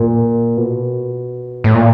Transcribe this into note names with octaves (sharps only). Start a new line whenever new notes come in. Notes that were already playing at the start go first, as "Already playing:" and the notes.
Already playing: A#2
B2
A2
A#2